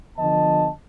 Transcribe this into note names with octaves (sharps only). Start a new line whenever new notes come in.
D3 F3 B3 D#5 A5